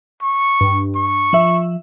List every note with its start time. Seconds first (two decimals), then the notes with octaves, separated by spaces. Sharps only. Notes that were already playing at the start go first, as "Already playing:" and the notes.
0.22 C#6
0.61 G2
0.96 C#6
1.33 F3 E5